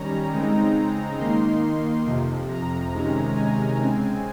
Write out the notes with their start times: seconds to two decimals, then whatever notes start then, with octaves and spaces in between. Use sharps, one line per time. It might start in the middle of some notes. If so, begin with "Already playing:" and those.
Already playing: D#3 G3 C#4 A#5
0.33 C#3 G#3 C4 D#4
1.18 D#3 A#3 D#4 C6
2.05 F2 C3 F3
2.49 A#5
2.92 C3 D#3 G#3 C#4
3.35 G#5
3.79 C#3 G#3 C4